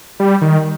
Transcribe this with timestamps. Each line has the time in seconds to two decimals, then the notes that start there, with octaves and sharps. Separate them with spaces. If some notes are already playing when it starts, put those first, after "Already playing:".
0.20 G3
0.42 D#3